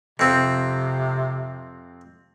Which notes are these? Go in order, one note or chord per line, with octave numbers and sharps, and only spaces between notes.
F2 C3 C4